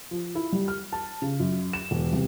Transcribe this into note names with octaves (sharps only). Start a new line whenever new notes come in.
F3
E4
G3
F6
A5
C#3
F#2
E7
E1
C2